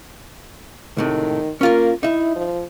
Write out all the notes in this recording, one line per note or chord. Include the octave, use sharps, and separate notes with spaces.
C#2 A2 C3 D#3
A#3 C#4 F4 A#4
D#4 E4 E5
F3